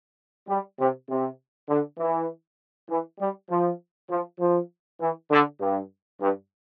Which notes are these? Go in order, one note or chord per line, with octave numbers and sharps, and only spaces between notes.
G3
C3
C3
D3
E3
E3
G3
F3
F3
F3
E3
D3
G2
G2